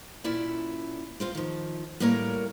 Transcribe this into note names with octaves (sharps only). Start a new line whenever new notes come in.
A#2 C#4 E4 D5 E5
C4 F4 C5
D#3 F3
A2 G3 A#3 A#4 C#5 A#5